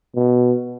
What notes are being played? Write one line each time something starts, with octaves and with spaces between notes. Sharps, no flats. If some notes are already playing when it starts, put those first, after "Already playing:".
B2